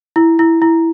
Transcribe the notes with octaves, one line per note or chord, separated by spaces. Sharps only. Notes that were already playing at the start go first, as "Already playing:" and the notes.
E4
E4
E4